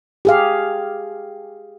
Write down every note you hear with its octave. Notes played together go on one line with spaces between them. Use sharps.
G4 G#4 F5